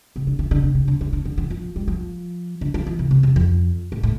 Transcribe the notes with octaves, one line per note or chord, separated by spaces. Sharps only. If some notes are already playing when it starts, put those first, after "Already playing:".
C3
D3
E3
D3
C3
C3
D3
E3
D3
D3
E3
F3
G3
F3
D3
F3
E3
C3
C3
E2
F2
A2
A2